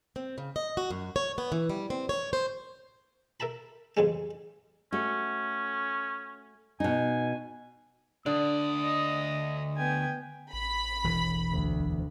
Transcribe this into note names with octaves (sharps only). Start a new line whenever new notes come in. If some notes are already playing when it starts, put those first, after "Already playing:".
C4
C#3
D#5
F#4
F#2
C#5
B3
E3
G3
C4
C#5
C5
A#4 E5 A5 B5
A1 F2 C#3 G#3
A3 C#4 F#4
B2 D#4 G#5
D2 D3 D5 D#6
D#5
B3 G5 G#5
A1 B5
E1 E3
D2